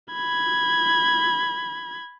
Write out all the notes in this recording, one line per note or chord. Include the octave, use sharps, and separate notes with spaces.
B5 G#6